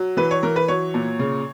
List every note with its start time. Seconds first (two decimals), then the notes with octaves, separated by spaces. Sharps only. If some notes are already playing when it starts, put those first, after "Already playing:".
Already playing: F#3
0.17 E3 B4
0.31 C#5
0.43 E3 A#4
0.56 B4
0.68 F#3 C#5
0.94 A#2
1.19 C#3